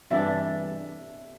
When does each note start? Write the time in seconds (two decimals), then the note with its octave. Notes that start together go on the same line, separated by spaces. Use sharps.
0.10 G2 E3 G3 D4 E5